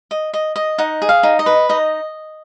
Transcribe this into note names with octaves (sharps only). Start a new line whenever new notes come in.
D#5
D#5
D#5
D#4 F#5
G#4
F5
D#4
D#5
B4
D#4 D#5